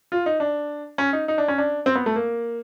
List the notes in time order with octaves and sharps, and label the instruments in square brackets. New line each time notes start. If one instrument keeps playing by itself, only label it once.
[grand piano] F4
D#4
D4
C#4
D#4
D#4
D4
C#4
D4
C4
B3
A3
A#3